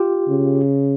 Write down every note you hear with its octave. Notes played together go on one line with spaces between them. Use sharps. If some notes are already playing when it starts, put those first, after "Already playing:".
Already playing: F4 G4
C#3